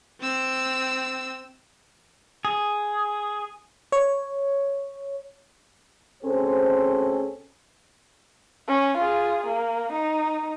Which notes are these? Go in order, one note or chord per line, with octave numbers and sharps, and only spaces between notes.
C4 E6
G#4
C#5
D2 C4 C#4 G#4 A4 C5
C#4
F4 G#4
A#3
D#4